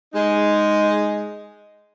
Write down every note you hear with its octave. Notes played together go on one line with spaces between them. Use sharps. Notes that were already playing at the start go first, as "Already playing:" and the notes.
G#3 D#4